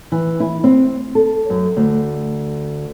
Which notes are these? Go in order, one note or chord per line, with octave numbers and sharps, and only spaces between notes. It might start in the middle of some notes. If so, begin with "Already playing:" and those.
E3
E4
C4
A4
F#2
D2